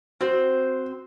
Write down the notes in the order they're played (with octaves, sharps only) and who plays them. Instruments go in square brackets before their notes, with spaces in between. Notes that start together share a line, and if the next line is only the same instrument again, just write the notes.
[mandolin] C4 C5 [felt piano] F#4